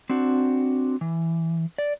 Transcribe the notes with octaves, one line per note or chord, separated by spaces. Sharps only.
C4 D4 F#4
E3
D5